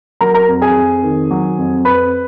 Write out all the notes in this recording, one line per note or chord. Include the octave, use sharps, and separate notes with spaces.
F#3 A#4 A#5
A#4 A#5
F2
G#4 G#5
F2
D#3
F#3
F2
F2 B4 B5